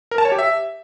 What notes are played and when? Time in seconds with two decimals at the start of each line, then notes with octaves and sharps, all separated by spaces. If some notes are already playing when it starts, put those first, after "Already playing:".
0.11 A#4
0.18 A5
0.25 C#5
0.32 G4
0.39 E5